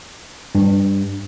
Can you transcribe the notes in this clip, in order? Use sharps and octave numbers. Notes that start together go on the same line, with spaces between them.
G2